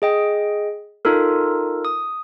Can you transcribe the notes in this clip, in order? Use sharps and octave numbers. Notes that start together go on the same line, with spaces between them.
G#4 D#5 G5
D#4 F4 A4 A#4
D#6